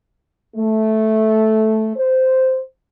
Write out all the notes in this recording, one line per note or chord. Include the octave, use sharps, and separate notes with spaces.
A3
C5